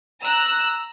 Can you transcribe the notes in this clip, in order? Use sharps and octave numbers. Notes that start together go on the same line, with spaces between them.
A#5 E6 F#6